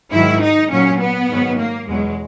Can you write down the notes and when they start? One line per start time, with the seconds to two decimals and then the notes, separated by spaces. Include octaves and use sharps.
0.12 G#2 D#3 F#3 E4
0.42 D#4
0.70 A#2 F#3 C#4
1.00 B3
1.29 G#2 D#3 F#3
1.58 A#3
1.87 E2 B2 F#3 G#3